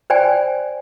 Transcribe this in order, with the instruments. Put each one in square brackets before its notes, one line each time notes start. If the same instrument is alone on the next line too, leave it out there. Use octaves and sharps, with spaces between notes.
[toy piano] C5 D5 G5 G#5